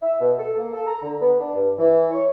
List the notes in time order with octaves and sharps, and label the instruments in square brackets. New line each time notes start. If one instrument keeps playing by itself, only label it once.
[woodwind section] E5
B2
A4
A#3
A4
A#5
D3
B3
D4
G2
E3
C#5